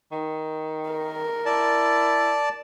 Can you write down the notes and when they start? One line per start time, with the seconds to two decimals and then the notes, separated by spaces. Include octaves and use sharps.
0.12 D#3
0.90 A#4
1.46 E4 D5 A5